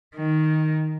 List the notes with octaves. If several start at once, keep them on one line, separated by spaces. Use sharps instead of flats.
D#3